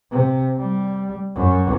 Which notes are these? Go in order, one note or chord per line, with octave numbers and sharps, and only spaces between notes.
C3
G3
F#2